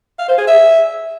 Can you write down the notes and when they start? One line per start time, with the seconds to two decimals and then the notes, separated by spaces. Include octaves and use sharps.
0.19 F5
0.28 C5
0.38 G#4
0.47 E5